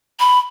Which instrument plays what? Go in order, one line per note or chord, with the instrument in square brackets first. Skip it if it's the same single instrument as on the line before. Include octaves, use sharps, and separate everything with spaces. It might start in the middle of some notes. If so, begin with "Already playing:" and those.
[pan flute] B5